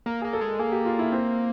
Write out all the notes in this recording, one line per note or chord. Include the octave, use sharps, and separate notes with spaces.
A#3 A#4
A#3 G#4
A4
G#3
A#3 G#4
G4
F4
E4
C4